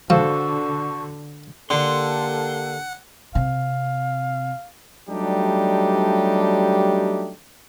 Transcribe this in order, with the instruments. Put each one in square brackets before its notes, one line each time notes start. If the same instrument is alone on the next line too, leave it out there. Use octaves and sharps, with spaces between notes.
[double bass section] D3 [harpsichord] F3 [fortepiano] F#4 A4 C5 [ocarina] C#6
[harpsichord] D3 [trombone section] A#3 G4 A4 [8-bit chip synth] F#5 [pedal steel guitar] C6
[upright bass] C3 [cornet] F5
[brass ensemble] F#3 G3 A3 D4 D#4 G4